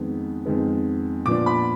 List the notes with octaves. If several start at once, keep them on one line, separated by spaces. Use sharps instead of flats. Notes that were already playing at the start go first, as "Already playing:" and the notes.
Already playing: F2 D#3 G#3 B3
F2 D#3 G#3 B3
A#2 F3 B3 D4 D6
B5